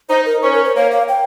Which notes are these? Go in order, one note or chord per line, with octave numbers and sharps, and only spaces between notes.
D#4 C5
A#4
C#4 C5
A#4
C5
A#3 C#5
F5
G5